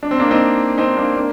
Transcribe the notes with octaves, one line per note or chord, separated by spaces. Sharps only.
D4
C4
A#3 D4
C4 D#4
C4 D#4
A#3 D4
A#3 D4